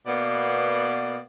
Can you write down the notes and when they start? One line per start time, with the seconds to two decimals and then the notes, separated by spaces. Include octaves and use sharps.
0.07 B2 A#3 B3 D5